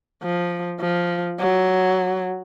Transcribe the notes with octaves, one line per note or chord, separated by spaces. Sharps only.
F3
F3
F#3